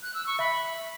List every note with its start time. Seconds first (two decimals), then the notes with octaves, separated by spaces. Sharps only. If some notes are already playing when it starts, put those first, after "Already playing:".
0.02 F#6
0.14 E6
0.27 C#6
0.39 E5 B5